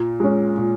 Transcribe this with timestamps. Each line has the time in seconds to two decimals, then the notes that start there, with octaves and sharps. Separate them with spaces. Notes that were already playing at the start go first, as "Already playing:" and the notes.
Already playing: A#2
0.20 G#3 C#4
0.57 A#2